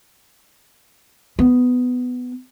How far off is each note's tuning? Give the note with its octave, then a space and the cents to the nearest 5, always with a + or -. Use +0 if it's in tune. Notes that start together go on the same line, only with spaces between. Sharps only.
B3 +15